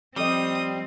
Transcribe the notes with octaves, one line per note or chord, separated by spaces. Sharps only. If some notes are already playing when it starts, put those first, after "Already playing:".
F3 G3 C4 A4 D#5 D#6